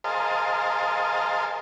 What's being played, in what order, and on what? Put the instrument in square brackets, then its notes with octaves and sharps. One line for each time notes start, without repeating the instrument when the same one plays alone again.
[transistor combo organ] G#4 A#4 C5 D#5 F5 A5